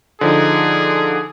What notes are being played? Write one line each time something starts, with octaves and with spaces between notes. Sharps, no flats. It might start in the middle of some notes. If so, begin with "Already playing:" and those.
D3 F3 D#4 G#4